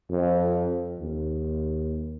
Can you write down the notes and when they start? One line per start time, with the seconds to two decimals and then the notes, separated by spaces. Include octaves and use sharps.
0.10 F2
1.00 D#2